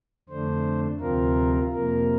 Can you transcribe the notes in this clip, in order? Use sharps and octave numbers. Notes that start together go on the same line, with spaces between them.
F2 D3 A3 D4 C5
D2 C3 F3 C4 F4 A#4
F2 C3 F3 A#3 A#4